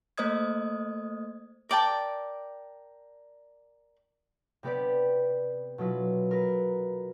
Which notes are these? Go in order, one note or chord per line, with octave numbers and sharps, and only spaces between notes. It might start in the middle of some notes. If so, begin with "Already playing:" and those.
A3 A#3 C5 D#5 D#6 G#6
A#4 D5 G5 A5
C3 B3 G4 B4 D5
B2 F#3 E4 F4
A#4 B4